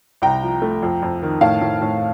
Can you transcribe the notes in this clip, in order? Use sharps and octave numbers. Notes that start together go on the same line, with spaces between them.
C2 G5 A#5
F3
A3
F2
F2
D#3
A2 F5 A5
A2
A2